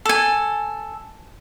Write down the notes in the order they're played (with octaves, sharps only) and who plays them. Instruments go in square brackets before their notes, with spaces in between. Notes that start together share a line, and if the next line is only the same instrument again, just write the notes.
[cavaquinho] A4 G#5